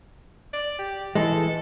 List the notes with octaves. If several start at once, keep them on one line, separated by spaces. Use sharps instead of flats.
D5
G4
E3 G#3 A4